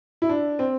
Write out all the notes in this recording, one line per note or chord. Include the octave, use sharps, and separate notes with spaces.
E4
D4
C4